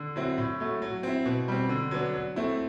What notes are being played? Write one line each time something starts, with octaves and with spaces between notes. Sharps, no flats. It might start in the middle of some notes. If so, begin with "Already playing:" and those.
Already playing: D3
F#3 C4 E4
A2
F#3 A3
F#3
C4 E4
B2
G3 C4
D3
F#3 B3 D4
F#3
A3 C4 E4